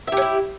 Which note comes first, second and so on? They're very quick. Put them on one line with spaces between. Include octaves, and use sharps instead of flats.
E5 G4 C#4 E4